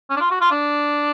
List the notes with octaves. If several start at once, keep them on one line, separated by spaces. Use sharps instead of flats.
C#4
D4
F4
F#4
F4
D4